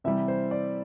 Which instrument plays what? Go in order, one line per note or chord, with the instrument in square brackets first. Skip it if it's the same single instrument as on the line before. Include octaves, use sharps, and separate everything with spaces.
[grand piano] C3 E3 G3 E5
C5
D5